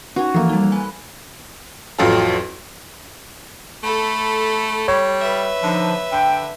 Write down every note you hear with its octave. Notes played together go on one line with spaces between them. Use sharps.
C#4 D#4 F#4
E3 F3 A#3 A4
G3 D#4
B4 G#5
A1 F2 F#3 F4 A4
A3 A4 B5
G3 C#5
B4 E5
D3 F3 D#4
D3 G5